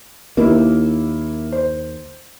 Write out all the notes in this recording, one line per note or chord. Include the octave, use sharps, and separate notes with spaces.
D#2 A#3 E4
C5